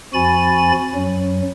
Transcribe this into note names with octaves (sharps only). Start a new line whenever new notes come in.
F2 F3 F#4 G#5 B5 A6
F#2 F#3